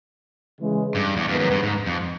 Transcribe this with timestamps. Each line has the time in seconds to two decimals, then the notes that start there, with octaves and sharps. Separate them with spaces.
0.60 C#3 E3 G#3
0.95 G2
1.17 E2
1.28 F2 D#3 G#3 B3
1.39 F#2
1.51 G2
1.63 G#2
1.86 F2